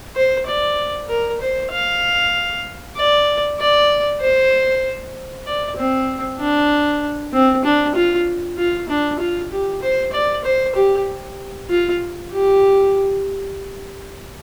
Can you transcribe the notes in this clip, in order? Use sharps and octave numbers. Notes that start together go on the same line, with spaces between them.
C5
D5
A#4
C5
F5
D5
D5
C5
D5
C4
D4
C4
D4
F4
F4
D4
F4
G4
C5
D5
C5
G4
F4
G4